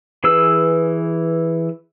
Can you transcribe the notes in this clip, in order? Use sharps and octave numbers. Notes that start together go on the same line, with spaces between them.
E3 G#4 B4 E6